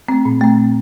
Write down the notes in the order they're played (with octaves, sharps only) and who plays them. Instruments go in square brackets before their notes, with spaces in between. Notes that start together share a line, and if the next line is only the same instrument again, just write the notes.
[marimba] A3 C4
A#2
A3 C4